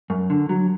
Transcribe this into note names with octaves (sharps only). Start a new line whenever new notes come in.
F#2
D3
F#3